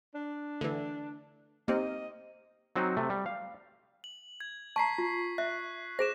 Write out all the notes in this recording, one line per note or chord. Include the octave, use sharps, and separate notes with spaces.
D4
D3 E3 A3 A4
A#3 C4 D#4 G4 C5 D#5
F#3 C4 D#4 F#4
C3 A3
G3
F5
F#7
G#6
A5 A#5 C#6 B6 C7
F4
E5 F#6
G#4 C5 A#6 E7